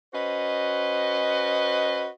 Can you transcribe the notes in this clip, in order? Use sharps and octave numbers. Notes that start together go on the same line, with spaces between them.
C#4 F#4 B4 C5 D#5